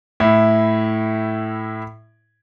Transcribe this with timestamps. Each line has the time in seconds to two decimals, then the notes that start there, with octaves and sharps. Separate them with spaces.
0.20 A2 E4